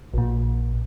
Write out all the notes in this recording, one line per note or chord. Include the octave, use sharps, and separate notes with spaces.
A#1 A#2